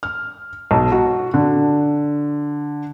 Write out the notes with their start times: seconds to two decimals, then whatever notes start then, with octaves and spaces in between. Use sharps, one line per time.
0.03 F6
0.71 B1
0.92 F#4
1.34 D3